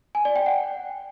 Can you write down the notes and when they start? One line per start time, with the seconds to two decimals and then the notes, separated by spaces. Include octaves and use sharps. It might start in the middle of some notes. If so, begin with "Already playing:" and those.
0.15 G#5
0.25 D5
0.36 G5
0.46 F#5